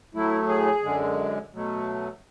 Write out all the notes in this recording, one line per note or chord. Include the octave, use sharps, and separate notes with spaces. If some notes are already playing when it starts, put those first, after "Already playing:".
A2 F#3 A3 E4
G#4
F#2 D3 G#3
B2 F#3 A3